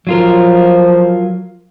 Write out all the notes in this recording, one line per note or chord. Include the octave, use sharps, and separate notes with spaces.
F3 F#3 F4 A#4